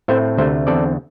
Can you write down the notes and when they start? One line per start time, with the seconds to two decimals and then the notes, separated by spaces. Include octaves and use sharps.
0.08 A2 A3 C4 C5 E5
0.37 D2 C3 A3 C5 E5
0.67 E2 D3 C4 A4 D5